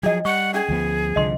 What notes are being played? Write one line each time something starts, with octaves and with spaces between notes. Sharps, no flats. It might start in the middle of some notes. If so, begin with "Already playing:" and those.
F3 F#3 D4 G#4 D#5
G3 F#5 C#6
C#4 D4 G#4
D2 F3 B3
C2 D3 F3 D#5 C6